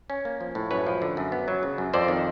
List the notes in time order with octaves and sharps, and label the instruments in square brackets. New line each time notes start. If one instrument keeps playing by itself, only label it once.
[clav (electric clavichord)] C#4
A#3
F3
A2
F#2 B4 C#5
F3
D3
F#2
B3
F#3
C#3
F#2
F2 C5 D5
D#3